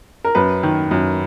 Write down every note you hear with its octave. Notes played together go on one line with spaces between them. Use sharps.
A#4
F#2 B4
D#3
F#2